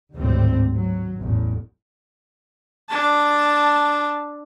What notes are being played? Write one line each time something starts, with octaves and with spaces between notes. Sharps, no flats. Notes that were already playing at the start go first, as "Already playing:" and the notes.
G#1 D2 A2 G3 C4
F#3
A1 E2
D4 A5